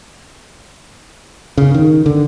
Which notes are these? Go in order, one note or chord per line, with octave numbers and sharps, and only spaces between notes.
C#3
D#3
D3